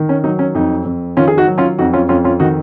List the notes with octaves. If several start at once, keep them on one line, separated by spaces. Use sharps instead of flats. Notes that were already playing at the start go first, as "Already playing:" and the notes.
Already playing: D#3
C#4
F#3 D#4
C#4
F2 D#4
F2
D#3 C#4 F4
G#4
D#4 F#4
F#3
C#4 F4
F2 D#4 F#4
C#4 F4
F2 C#4 F4
C#4 F4
D#3 D#4 F#4